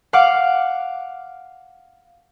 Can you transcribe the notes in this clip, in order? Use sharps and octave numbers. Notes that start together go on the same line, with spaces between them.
F5 F#5 D6 F6